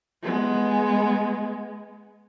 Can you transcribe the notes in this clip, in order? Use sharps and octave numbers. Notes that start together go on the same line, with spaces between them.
G#3 B3